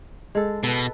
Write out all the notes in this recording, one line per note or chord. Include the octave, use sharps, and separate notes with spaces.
G#3 A4
B2 A4 B4